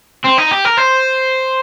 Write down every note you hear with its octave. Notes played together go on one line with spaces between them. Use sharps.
C4
D#4
G4
A#4
C5